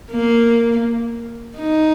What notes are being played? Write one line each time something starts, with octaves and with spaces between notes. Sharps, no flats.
A#3
D#4